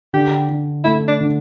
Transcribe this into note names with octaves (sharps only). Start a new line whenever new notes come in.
D3 G4
D3
A3 E4
D4
D3